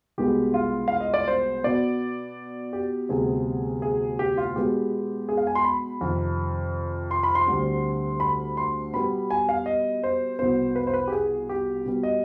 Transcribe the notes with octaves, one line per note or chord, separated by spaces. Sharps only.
C2 B2 G#3 B3 G4
F4
F5
D#5
D5
C5
B2 B3 D5
G4
D2 C3 G3 B3 G#4
G#4
G4
F4
B2 G#3 B3 G4
G#4
F5
G#5
C6
B5
F2 C3 D#3
C6
B5
C6
D2 D3 G3 C4
B5
C6
B2 G3 B3 B5
G#5
F5
D#5
C5
C2 B2 B3 C5
B4
C5
B4
G4
G#4
G4
B2 G3 B3
D#5